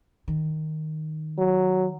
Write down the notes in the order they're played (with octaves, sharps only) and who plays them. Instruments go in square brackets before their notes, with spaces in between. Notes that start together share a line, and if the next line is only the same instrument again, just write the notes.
[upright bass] D#3
[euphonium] F#3